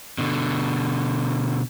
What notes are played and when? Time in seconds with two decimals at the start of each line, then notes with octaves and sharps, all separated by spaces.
0.18 B2 D3